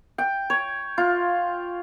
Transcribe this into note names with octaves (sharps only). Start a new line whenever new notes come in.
G5
C#5
F4